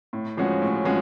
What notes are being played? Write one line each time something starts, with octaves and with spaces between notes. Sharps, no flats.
A2
F3 G#3 C#4 F#4
A2
F3 G#3 C#4 F#4